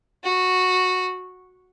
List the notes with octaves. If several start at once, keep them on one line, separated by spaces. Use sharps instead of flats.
F#4